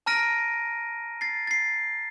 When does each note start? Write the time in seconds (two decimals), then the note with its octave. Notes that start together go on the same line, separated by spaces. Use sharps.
0.06 A5 A#5 F6 A#6 D7 D#7
1.21 A6 C7
1.47 A6 C7